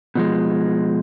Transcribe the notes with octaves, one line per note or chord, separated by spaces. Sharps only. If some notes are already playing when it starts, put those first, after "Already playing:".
B2 F3 G#3